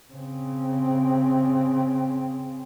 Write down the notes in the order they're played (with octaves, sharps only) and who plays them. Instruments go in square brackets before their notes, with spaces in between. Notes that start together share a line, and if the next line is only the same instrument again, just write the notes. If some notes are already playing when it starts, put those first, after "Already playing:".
[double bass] C#3 C4